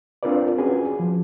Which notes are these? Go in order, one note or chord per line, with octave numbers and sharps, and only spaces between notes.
C4 D4 F4 A#4 B4 D5
C#4 F#4 G#4 B4
F3